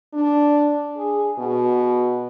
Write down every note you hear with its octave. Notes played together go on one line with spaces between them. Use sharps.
D4
G#4
B2